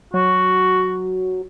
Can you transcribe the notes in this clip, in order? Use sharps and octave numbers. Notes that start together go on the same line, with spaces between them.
F#3 F#4